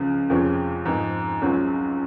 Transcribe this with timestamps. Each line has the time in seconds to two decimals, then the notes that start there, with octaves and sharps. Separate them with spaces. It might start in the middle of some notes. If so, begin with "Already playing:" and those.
Already playing: C#2 C#3 F3
0.30 F2 C3 F3 G#3 C#4
0.85 G#2 F3 C4 D#4
1.42 C#2 C#3 F#3 C4